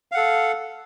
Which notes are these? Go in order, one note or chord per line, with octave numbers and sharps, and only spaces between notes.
A4 F5 F#5